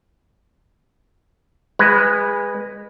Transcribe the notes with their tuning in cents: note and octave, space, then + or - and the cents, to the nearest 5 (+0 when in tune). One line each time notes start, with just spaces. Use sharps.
G#3 -20 B4 +0